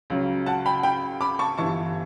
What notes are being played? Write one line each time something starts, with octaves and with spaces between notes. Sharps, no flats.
C#2 C#3 F#3
F#5 A5
G5 B5
G5 B5
B5 D6
A5 C#6
G1 G2 E3 A5 C#6